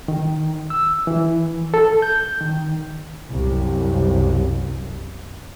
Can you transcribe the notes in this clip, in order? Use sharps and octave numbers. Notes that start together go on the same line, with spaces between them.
D#3
E6
E3
A4
G6
D#3
C2 F#2